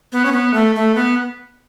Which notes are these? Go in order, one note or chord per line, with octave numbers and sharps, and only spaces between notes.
B3
C#4
B3
A3
A3
B3